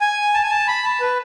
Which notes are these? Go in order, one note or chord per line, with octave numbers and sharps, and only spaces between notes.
G#5
A5
G#5
A5
B5
A5
B4